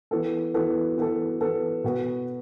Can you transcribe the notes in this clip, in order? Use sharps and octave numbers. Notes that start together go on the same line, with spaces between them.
E3 B3 A4
E3 B3 A4
E3 B3 A4
E3 B3 A4
B2 B3 F#4 B4